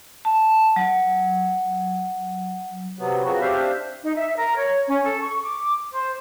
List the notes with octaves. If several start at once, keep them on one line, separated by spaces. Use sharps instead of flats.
A5
F#3
C3 F#3 B3
C#3 F3 F#3 B3 C4 F#4
C4 D4 G4 C5 E5 F5
D#4
E5
A#4
C#5
C#4
A4
C#6
D6
C5